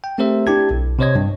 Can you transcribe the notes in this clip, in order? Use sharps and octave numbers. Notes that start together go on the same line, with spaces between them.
G5
A3 C4 G4 A#4 C5 E5
D4 E4 G4 A5 G#6
B1
C3 G4 C5 C#5 D#5 G#6
G2